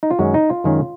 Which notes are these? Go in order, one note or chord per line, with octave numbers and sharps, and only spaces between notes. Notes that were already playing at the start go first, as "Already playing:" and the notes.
D#4
F4
F#2 D#3 G#3 C#4 F#4
D#4
F4
F#2 D#3 G#3 C#4